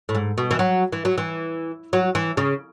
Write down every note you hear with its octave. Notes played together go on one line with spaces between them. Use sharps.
A2
G#2
B2
E3
F#3
E3
F#3
E3
F#3
E3
C#3